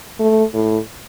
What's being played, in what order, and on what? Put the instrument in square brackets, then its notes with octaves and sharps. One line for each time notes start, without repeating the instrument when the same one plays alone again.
[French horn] A3
A2